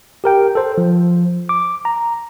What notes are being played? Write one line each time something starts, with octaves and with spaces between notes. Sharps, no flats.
G4 A#4 G5
A4 C5
F3
D6
A#5